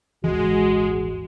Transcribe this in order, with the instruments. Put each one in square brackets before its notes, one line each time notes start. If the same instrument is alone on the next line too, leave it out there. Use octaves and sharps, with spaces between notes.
[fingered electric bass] D#1 G#1 E3 [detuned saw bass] G#3 [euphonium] F#4